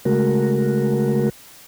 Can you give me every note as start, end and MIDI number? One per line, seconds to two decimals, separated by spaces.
0.05 1.29 49
0.05 1.29 56
0.05 1.29 57
0.05 1.29 66
0.05 1.29 70